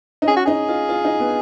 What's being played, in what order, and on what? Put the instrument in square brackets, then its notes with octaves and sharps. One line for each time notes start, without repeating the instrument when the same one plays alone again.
[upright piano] D#4
[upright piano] C#4 [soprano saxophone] G#4
[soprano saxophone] F#4
[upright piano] D#4 [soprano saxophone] G#4
[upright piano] F4
F4
D#4
B3